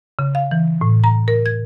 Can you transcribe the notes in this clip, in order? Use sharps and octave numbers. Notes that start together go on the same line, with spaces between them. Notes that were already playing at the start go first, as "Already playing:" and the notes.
C#3
F5
E3
A2
A#5
A#4
G#6